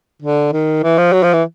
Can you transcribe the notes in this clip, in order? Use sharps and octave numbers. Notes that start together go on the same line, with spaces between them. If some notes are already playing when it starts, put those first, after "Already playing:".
D3
D#3
E3
F3
F#3
F3
E3